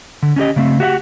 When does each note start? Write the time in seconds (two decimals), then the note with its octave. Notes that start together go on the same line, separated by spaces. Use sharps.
0.23 D3
0.36 C#4 D4 G4 D#5
0.56 C#3 A3 C4
0.80 F#4 G4 E5 F#5